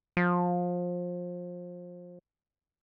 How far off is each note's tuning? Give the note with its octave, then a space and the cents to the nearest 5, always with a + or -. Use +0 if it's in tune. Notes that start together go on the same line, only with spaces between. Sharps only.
F3 +25